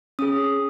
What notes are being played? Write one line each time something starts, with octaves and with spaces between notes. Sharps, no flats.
C#4 G#4 D#6